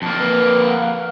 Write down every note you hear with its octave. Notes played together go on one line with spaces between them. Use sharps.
F2 A#3 A5
B4
F#5
F5